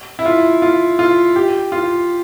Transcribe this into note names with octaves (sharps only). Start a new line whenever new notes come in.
E4
F4
F4
F4
G4
F4